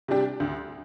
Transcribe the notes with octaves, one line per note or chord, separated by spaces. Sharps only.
C3 G3 D4 G4
D2